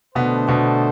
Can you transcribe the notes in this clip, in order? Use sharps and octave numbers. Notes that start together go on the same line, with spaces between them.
B2 D3 A3 B3 D4 A4 C5
B2 B3